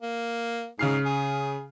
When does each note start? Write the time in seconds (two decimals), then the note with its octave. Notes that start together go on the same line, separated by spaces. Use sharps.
0.02 A#3
0.79 G#2 C#3 F6 C7
1.05 G#4